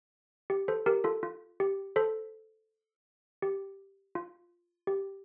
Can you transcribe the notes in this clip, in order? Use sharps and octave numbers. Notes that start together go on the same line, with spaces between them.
G4
A4 C5
G4 A#4
F4 A4
F4
G4
A4 C5
G4
F4
G4